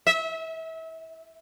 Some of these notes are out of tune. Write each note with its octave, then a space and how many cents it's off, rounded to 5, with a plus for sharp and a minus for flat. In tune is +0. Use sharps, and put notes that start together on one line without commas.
E5 -30